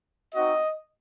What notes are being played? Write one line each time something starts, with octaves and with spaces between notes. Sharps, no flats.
C4 D#4 F#4 D#5